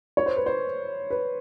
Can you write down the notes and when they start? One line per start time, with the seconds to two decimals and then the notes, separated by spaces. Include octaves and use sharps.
0.17 C#5
0.26 C5
0.36 B4
0.46 C5
1.11 B4